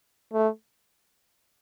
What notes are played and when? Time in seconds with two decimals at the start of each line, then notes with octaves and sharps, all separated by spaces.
0.33 A3